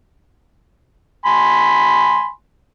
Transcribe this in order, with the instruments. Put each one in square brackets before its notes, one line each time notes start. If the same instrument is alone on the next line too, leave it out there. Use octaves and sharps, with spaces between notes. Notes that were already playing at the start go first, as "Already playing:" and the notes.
[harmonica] G#5 B5 C6